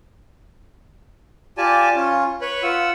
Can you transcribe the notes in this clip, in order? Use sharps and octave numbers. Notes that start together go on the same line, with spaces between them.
F4 G4 D5 G#5 A5
C#4 F4
B4 C#5 B5
F4 F#5 E6